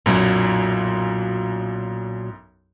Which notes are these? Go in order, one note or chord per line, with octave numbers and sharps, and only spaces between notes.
B1 F#2 A#2 F#3